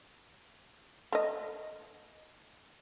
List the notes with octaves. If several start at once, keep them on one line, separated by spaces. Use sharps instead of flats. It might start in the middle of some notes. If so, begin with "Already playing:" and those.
A3 D#5